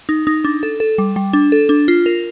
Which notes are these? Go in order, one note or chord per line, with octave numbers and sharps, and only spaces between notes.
D#4
D#4
D4
A4
A4
G3
G3
D4
A4
D4
F4
A#4